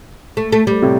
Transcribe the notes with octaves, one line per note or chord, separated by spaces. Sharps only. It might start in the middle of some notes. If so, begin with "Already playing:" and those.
A3
A3
G3
A2 C3